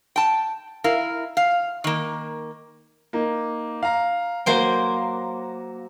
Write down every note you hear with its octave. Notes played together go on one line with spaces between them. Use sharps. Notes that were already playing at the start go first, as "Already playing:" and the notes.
G5 A5
E4 A#4 F5
F5
D#3 A#3
A#3 D#4
F5 A#5
F#3 A#3 F#4 C5 G5